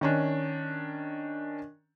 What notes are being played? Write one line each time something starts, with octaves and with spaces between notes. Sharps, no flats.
D#3 C#4 D4